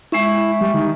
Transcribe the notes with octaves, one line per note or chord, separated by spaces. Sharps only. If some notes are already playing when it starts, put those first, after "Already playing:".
G#3 E4 E5 C#6
G3
D#3